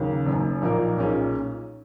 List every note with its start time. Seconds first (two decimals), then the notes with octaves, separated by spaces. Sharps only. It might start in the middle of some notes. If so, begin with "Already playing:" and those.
Already playing: D#2 C#3 F#3 A#3
0.26 F#1 F#2 D#3
0.62 A#1 A#2 A#3 D#4 A#4
0.96 B1 A#2 A#3 C#4 G#4